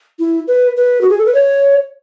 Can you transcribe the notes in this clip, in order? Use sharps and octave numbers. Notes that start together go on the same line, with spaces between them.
E4
B4
B4
F#4
G#4
A4
B4
C#5